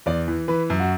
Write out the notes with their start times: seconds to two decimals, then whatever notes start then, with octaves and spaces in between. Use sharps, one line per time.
0.06 E2 D5
0.28 E3
0.48 E3 B4
0.70 F#2
0.80 F#4